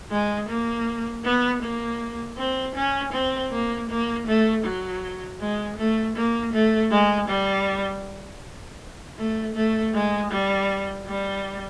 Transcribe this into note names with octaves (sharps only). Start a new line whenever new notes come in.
G#3
A#3
B3
A#3
C4
C#4
C4
A#3
A#3
A3
F#3
G#3
A3
A#3
A3
G#3
G3
A3
A3
G#3
G3
G3